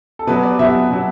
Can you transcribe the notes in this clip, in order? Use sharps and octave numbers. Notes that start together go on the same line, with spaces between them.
A4
B2 F#3 B4
D5
B2 F#3 E5
B2 F#3